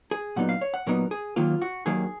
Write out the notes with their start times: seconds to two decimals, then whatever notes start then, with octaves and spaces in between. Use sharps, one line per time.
0.11 G#4
0.36 A#2 F#3 B3 D#4 F#5
0.49 F5
0.61 C#5
0.74 F#5
0.87 A#2 F#3 B3 D#4 A#4
1.11 G#4
1.36 D#2 D#3 F#3 A#3 F4
1.62 F#4
1.86 D#2 D#3 F#3 A#3 G#4